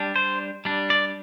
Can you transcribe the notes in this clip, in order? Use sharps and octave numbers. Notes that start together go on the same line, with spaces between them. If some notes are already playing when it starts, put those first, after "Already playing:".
Already playing: G3 D4
C5
G3 D4
D5